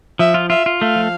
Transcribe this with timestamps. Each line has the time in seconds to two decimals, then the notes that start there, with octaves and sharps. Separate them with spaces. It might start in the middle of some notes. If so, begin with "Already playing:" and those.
0.19 F3 E5
0.34 F4
0.50 F4 E5
0.66 F4
0.81 A3 F5
0.96 F3